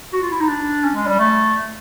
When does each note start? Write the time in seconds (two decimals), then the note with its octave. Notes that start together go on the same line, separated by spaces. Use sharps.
0.13 F#4
0.22 F4
0.31 E4
0.40 D#4
0.49 D4
0.84 C#4
0.95 G#3
1.07 G3
1.19 A3